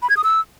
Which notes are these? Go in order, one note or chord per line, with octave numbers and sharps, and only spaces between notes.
B5
G#6
D#6
E6